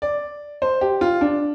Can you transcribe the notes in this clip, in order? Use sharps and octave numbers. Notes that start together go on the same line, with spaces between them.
D5
C5
G4
F4
D4